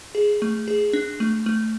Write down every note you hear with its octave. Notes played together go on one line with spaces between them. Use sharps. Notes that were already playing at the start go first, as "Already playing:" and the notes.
G#4
A3
G#4
D4
A3
A3